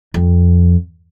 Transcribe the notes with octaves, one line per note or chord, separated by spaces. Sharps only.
F2